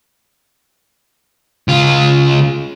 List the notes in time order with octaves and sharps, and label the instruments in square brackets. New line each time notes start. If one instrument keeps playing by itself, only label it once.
[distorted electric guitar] C#2 F4